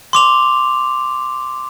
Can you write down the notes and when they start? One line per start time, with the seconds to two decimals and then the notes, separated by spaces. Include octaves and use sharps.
0.13 C6 D6 F7